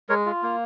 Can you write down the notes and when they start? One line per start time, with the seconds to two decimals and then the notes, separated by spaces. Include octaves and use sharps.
0.09 G#3 A#4 C#5
0.26 F4
0.43 A#3